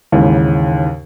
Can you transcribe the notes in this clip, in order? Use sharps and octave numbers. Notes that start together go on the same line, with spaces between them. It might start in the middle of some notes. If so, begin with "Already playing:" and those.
D#2 G#2 C#3 E3